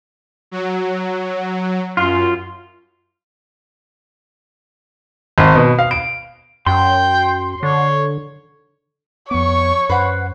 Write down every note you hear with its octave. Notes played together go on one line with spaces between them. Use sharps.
F#3
F#2 F4
G#1
B2
F5
D7
F#2 G5 C6
D3 C#5
F2 B3 C#5 C#6
F#2 B4 C5 F#5